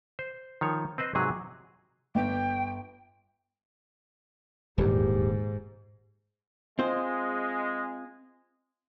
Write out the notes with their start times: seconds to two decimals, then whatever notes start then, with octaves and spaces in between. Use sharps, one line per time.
0.19 C5
0.61 D#3 F3 C#5
0.98 C4 B4 C5 D#5
1.15 G#2 C3 F#3 G#4
2.15 G1 G5
4.78 D#1 E2 G#2 G4
6.79 G#3 C4 F4 C5